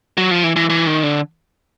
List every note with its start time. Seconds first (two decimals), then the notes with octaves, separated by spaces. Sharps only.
0.17 F#3
0.31 F3
0.43 E3
0.56 E3
0.70 E3
0.87 D#3
1.03 D3